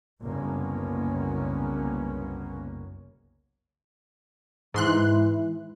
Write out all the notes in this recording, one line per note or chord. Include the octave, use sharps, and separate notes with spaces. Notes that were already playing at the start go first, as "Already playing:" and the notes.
F#1 C2 A#3 B3 C#4
G#2 E3 C6 F#6